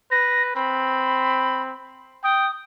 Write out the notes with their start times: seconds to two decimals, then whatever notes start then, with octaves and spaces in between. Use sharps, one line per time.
0.12 B4 A#6
0.56 C4 B5
2.24 G5 D#6